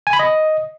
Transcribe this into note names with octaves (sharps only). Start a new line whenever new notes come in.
G#5
B5
D#5